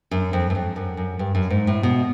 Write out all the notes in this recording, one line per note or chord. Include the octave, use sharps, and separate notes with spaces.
F#2
F2
F#2
F2
F#2
F#2
G2
F#2
G#2
A2
B2